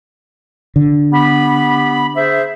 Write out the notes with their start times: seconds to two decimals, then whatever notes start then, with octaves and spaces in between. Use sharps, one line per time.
0.76 D3
1.12 B3 G4 B5
2.16 G#4 C5 E5